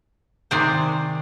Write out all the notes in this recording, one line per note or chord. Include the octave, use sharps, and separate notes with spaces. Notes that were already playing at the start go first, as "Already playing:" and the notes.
C3 D#3 G#3 C5 D5